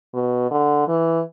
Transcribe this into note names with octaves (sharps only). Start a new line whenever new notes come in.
B2
D3
E3